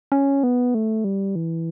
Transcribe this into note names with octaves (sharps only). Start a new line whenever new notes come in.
C#4
B3
A3
G3
E3